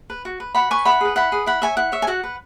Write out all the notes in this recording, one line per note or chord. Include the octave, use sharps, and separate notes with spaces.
B4
F#4
B4
F#4 F#5 B5
B4 G#5 C#6
E4 F#5 B5
G#4 B4
E4 F#5 B5
G#4 B4
E4 F#5 B5
C#5 E5 G#5
E4 F#5
C#5 E5
G#5
F#4 F#5
B4